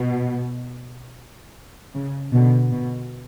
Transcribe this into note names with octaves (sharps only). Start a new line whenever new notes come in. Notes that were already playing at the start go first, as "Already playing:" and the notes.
Already playing: B2
C#3
B2 D3
B2